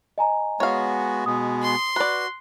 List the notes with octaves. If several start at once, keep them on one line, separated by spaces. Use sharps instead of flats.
D#5 G#5 A#5
G#3 B3 F#4 C#5 F5
B2 G#3 B3 D#6
C6
F#4 B4 D5 F#6